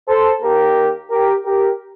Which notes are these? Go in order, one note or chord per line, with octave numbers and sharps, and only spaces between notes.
A4 C5
D#2 D#3 A#3 G4 A#4
G4 A#4
G4 A#4